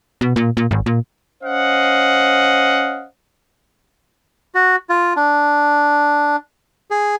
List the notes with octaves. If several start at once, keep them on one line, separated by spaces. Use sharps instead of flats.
B2
A#2
A#2
G#1
A#2
C#4 C5 D#5 F5 F#5
F#4
F4
D4
G#4